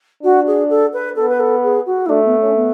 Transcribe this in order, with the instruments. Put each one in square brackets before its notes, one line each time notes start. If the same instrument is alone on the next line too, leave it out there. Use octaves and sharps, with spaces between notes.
[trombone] D4 [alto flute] F#4
[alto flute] G#4
A4
B4
[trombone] B3 [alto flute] A4
[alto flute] B4
A4
G#4
F#4
E4
[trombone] A3 [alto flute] D4
[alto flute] B3
C#4
B3